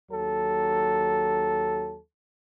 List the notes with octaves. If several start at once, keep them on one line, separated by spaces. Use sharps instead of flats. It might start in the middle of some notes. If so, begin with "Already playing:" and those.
D#2 F#3 A4